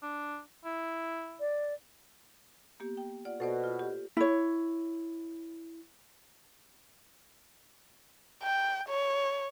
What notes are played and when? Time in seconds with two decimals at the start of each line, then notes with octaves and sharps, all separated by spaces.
0.02 D4
0.65 E4
1.40 D5
2.80 A#3 B3 G4
2.97 G5
3.25 F4 D5 F#5
3.40 B2 A4 C5 D5
3.64 F4
3.79 G4
4.17 E4 C#5
8.43 G5
8.89 C#5